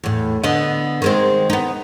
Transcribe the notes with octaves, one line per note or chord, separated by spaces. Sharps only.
E2 A2
D3 B3 D#5
D#3 G#3 C4
B3 D#4